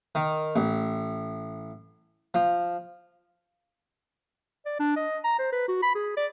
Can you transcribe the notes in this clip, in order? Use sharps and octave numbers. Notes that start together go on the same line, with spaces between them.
D#3
A1
F3
D5
D4
D#5
A#5
C5
B4
F#4
B5
G#4
D5